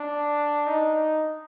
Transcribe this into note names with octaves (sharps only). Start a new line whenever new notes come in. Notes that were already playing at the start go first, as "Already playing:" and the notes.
Already playing: D4
D#4